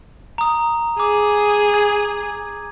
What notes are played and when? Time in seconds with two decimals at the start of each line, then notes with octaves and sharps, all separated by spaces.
0.38 A#5 D#6
1.00 G#4 D6
1.74 G#6